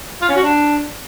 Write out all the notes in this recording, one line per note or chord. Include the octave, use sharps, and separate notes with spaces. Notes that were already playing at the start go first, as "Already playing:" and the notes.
F4
C#4
F#4
D4